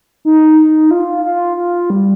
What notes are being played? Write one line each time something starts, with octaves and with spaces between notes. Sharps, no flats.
D#4
F4
F4
F4
G3